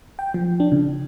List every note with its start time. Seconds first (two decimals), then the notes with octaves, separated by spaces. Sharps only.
0.19 G5
0.34 F3
0.60 D4
0.72 C#3